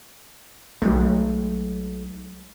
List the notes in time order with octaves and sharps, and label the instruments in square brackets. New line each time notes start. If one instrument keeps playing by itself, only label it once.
[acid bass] B1 [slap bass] F#3 G#3 A3